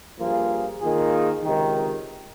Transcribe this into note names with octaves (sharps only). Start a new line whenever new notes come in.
G2 F3 A#3 F4 G#4
D#3 A#3 F4 G#4
C#2 C3 D#3